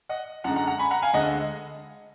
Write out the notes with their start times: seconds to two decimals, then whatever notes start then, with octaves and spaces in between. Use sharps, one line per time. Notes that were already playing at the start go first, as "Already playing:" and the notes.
0.09 D#5 F#5
0.44 F#2 D3 G#3 F#5 A#5
0.56 F#5 A#5
0.67 F#5 A#5
0.79 G#5 B5
0.91 F#5 A#5
1.02 F5 G#5
1.14 D2 D3 G#3 D#5 F#5